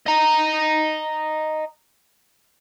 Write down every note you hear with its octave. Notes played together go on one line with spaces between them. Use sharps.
D#5 A#5